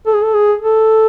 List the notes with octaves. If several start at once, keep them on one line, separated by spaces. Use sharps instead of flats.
A4
G#4
A4
G#4
A4